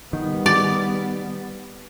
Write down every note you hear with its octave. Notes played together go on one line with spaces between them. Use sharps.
D#3 G3 B3
D5